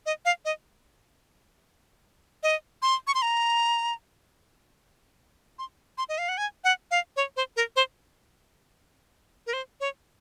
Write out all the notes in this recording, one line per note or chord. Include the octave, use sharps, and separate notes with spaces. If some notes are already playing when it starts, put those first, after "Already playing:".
D#5
F5
D#5
D#5
C6
C#6
C6
A#5
C6
C6
D#5
F5
F#5
G#5
F#5
F5
C#5
C5
A#4
C5
A#4
C5
C#5